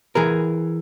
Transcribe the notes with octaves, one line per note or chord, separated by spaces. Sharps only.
E3 G#4 A#4